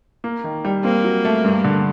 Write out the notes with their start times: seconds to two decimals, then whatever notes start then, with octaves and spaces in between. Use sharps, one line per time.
0.24 A#3
0.44 D#3
0.65 G3
0.84 A#3 C4
1.04 F#3
1.25 A3
1.44 G2
1.64 D3